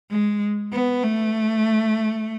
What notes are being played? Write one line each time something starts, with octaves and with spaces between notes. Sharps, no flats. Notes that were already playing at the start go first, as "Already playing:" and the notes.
G#3
B3
A3